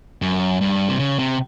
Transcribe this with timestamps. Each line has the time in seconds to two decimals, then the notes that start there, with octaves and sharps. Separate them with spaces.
0.22 F#2
0.61 G2
0.89 C3
0.99 C#3
1.19 C3